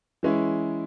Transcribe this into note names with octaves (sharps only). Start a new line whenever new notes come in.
E3 G#3 C#4 E4